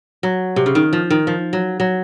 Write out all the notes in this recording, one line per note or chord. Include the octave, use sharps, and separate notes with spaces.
F#3
C3
C#3
D#3
F3
D#3
F3
F#3
F#3